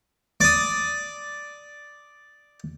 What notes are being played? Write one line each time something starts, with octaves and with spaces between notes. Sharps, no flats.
D5 D#6